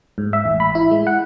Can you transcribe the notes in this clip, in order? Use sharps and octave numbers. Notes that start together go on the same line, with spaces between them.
G#2
E5
A1
B5
E4
G#3
F#5